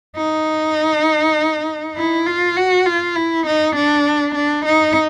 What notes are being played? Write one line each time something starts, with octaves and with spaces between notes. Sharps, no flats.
D#4
E4
F4
F#4
F4
E4
D#4
D4
D4
D#4